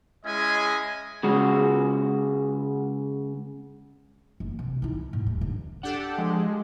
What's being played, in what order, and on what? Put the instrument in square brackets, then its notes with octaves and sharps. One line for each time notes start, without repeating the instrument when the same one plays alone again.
[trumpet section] G#3 C#4 E4 G#4 D#5 G#5
[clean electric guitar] C#3 G#3 F#4
[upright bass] F#1 F#2
C3
D#4 E4
A2
D#1
D3
[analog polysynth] D4 G4 A4 [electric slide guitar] F#5
[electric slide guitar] F3 [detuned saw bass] G#3